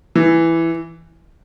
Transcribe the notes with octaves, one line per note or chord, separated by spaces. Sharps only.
E3